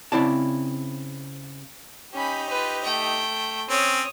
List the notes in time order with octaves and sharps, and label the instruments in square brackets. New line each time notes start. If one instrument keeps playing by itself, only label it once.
[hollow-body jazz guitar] C#3 C4 E4 D5 A5
[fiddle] C#4 B5 [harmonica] D#4 G4
[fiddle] F4 B4
A3 G5
[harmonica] C4 C#4 [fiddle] C#5 D#6